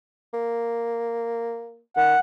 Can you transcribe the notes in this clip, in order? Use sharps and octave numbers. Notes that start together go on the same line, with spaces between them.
A#3
D#3 F#5